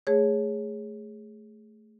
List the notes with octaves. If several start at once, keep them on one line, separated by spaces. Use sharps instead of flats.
A3 G#4 C#5